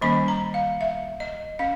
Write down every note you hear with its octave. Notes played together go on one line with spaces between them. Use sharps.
D#3 G3 A#3 C#4 B5
A#5
F5
E5
D#5
C#4 F5